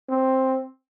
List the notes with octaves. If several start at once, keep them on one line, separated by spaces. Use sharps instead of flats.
C4